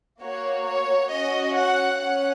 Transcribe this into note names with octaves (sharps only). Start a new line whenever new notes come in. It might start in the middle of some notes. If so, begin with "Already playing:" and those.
A#3 F#4 C#5
C#5
C#4 F#4 D#5
F#5
C#4 F#5